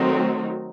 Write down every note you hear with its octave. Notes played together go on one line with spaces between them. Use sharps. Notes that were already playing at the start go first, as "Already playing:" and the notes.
Already playing: D#3 F#3 A3 C4 D#4